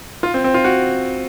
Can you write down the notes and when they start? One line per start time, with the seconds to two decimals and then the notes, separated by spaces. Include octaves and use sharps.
0.23 F4
0.34 C4
0.44 C4
0.54 F4
0.64 F#4